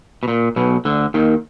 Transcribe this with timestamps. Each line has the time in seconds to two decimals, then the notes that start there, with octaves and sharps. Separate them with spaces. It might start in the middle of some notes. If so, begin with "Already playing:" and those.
0.23 B2
0.28 A#2
0.56 B1 B2
0.85 D2 D3
1.14 D#2 D#3